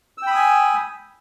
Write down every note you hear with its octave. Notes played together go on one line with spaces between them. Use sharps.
G5 G#5 B5 D#6 E6